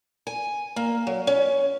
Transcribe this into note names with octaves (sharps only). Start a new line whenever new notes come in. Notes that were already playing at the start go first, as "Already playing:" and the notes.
G#5
A#3
F#3
C#4